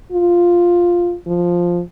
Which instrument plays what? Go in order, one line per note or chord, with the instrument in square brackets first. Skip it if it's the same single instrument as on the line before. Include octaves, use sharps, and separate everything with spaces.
[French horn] F4
F3